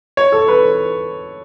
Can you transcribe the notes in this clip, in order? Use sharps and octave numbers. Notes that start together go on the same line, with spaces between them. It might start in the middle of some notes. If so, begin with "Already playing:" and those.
C#5
A4
B4